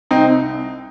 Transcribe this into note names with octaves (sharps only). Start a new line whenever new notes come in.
C2 C4 D#4